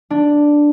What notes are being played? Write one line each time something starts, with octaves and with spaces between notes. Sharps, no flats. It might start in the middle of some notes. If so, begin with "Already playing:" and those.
D4